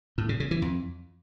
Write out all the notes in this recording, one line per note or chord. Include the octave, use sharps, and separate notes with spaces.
A2
C#3
C#3
E3
F2